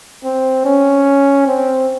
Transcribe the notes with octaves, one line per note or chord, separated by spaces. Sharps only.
C4
C#4
C4